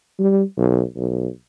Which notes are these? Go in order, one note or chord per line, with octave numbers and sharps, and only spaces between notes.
G3
B1
B1